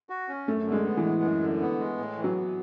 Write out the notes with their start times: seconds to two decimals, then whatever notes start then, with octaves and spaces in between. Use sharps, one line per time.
0.09 F#4
0.28 C#4
0.48 F#2 A3
0.66 D3
0.72 G#3
0.85 B3
0.97 E3
1.04 G#3
1.22 F#2
1.42 D3
1.61 B3
1.79 G#3
1.98 A2
2.18 E3
2.24 F#3
2.36 B3